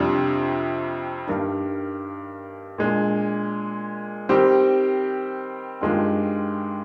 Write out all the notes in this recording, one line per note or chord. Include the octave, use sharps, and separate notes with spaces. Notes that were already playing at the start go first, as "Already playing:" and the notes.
Already playing: F2 C3 G3 D4
G2 D#3 A#3 D4
A#2 G#3 D4
D#3 G3 C4 G4
G2 D#3 G#3 D4 F4